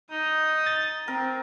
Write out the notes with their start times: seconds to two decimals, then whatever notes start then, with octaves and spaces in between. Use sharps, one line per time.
0.11 D#4 D#6
0.67 A6
1.08 C4 A#4